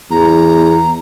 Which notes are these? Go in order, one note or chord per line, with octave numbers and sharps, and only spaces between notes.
E2 A#5